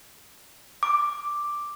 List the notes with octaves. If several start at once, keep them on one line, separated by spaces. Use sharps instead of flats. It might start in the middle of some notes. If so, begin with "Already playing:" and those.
D6